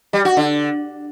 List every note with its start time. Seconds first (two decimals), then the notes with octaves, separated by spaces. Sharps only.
0.13 G3
0.25 F#4
0.37 D3